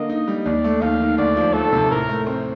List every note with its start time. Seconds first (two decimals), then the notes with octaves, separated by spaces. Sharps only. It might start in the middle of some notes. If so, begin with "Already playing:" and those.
Already playing: D3 A#3 D#5
0.10 D#4
0.28 G3
0.46 D#2 D5
0.64 A3
0.82 D#2 F5
1.00 D#3
1.18 D2 D5
1.36 F3
1.54 A3 A4
1.73 C3
1.91 A2 A#4
2.09 A3
2.27 C4